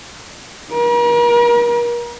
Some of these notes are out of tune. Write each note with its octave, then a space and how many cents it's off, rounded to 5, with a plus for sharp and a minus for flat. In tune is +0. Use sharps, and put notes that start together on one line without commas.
A#4 +40